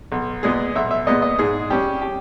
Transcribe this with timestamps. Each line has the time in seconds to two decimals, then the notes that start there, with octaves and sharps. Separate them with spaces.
0.12 B1
0.43 A#2 G#3 B3 G#4
0.75 B1 E5
0.91 E5
1.06 A#2 G#3 B3 D#5
1.22 D#5
1.39 G#2 G#4
1.70 G3 C#4 G4
2.01 G4